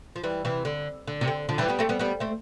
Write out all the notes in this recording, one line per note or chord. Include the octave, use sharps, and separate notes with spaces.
F3
E3 G3
C3 E3
D3
D3
C3
D3
D3 F3
E3 G3
G3 B3
A3 C4
G3 B3
G3 B3
A3 C4